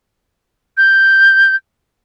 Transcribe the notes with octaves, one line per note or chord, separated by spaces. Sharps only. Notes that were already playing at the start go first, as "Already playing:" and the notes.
G6